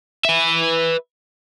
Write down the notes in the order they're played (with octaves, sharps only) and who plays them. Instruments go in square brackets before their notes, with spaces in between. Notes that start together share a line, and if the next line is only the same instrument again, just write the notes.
[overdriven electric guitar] B4 E5